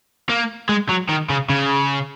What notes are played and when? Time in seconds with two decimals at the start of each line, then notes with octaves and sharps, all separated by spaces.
0.29 A#3
0.69 G#3
0.89 F#3
1.09 D#3
1.30 C#3
1.50 C#3